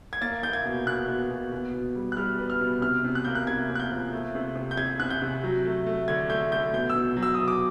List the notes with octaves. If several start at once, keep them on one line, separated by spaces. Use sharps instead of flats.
G#6
A#3 A6
A#3 G6
G#6
B2
B2 F#6
B2
B2
B2
B2
G3
F#6
G3 F6
B3
F6
B2
C3 F6
C3
F#6
A#3 G6
F#6
C3 G#6
A#3
F#6
G6
F3
A3
C3
C3
G6
C3 G#6
C3 F#6
G6
C3
F#3
A3
A3
D3 G#6
A3 G6
A3 G6
B2 G6
E6
B2
F#3
E6
B2 D#6
D6